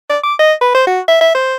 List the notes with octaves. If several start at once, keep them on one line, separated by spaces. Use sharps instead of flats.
D5
D6
D#5
B4
C5
F#4
E5
E5
C5